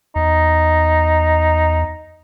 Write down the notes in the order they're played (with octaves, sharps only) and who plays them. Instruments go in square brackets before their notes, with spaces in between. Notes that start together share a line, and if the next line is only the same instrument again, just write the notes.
[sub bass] E2 [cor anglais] D#4